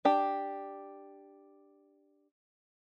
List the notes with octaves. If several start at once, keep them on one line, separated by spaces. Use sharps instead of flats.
D4 G4